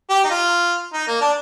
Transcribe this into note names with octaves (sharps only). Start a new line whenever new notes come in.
G4
D#4
F4
D#4
A#3
D4